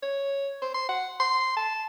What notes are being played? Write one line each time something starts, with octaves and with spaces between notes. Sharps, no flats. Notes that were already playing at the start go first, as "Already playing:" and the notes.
C#5
C5
C6
F#5
C6
A5